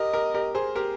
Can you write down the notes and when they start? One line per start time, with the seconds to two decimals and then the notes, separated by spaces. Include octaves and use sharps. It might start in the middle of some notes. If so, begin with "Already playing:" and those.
Already playing: G4 A#4 D#5
0.13 G4 A#4
0.34 G4 A#4
0.55 G#4 C5
0.75 G4 A#4